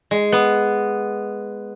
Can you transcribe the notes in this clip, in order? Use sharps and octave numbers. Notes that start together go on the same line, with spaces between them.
G#3
B3